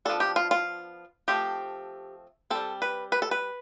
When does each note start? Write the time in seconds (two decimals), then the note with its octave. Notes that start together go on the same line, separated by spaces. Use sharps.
0.05 F3 B3 D4 A4
0.20 G4
0.36 F4
0.51 F4
1.28 F3 A3 C4 G4
2.50 G3 C4 A4
2.82 B4
3.12 B4
3.22 A4
3.31 B4